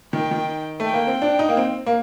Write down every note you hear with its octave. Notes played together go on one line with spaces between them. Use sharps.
D#3 G5
D#3
A3
G5
A#3
C4
D4
D#4
A#3
C4
A#3